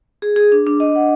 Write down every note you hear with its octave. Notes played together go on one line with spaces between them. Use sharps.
G#4
G#4
D4
D4
D#5
F#5